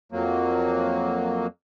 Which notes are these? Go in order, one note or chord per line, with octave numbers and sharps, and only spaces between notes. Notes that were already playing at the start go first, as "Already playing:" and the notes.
F2 F#3 A#3